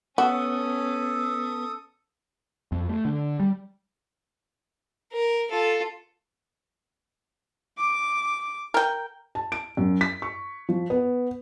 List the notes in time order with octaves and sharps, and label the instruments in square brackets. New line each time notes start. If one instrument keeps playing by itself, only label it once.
[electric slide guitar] B3 [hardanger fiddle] C#4 [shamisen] F#4 [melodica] A4 D#6
[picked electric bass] F2
A3
D3
G3
[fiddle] A#4
F4 A4
[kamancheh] D6
[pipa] A#4 G5
[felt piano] A5
D7
F#2
B6
C#6
F3
B3